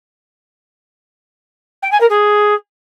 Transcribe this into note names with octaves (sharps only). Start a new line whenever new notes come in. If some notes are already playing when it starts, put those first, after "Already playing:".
G5
G#5
A#4
G#4